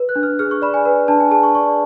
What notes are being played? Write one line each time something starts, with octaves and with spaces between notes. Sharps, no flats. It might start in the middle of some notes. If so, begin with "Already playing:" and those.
Already playing: B4
F#6
D4
F6
G#4 F6
C#6
D5 B5
G#5
B4
D4 A5
G#5
G#4 A5
C#6
D5 C#6